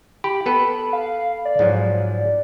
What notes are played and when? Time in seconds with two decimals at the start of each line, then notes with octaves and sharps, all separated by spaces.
0.24 G4 B5
0.46 B3 A4 B4
0.93 F5
1.45 D5
1.59 G#2 F3 F#3